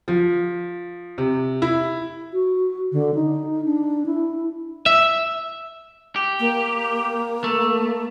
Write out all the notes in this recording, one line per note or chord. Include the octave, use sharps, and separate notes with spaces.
F3
C3
E4
F#4
D3
D#4
D4
E4
E5
G4
A#3
A3